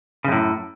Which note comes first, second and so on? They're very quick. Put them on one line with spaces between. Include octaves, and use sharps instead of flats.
C#3 F#2 A2